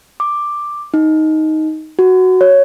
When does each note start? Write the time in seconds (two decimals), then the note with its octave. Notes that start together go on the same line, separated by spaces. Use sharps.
0.20 D6
0.94 D#4
1.99 F#4
2.41 C#5